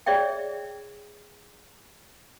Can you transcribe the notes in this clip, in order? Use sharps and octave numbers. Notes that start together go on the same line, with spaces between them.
G#4 C#5 D5 E5 G5